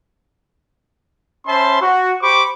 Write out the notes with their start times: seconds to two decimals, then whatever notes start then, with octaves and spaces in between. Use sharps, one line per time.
1.47 C#4 C5 E5 A5 B5 C6
1.82 F#4
2.22 G4 C5 B5 C#6 D6